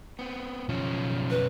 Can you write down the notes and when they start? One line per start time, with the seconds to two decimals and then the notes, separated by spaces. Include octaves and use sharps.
0.19 B3 C4
0.69 B1 C#3 F3 C#4
1.30 B4